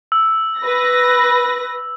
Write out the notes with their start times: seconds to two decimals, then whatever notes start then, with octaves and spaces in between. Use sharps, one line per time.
0.12 E6
0.60 B4 A#6